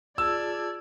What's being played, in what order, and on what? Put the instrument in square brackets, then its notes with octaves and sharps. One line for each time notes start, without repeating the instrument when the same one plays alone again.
[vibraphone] F4 G#4 A5 [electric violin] D5 G#6 [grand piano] E6